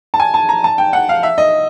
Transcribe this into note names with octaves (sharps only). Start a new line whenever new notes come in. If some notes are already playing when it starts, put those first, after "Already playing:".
A5
G#5
A5
A#5
A5
G5
F#5
F5
E5
D#5